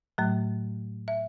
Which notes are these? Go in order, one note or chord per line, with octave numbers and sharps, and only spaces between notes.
A2 F#3 A3
E5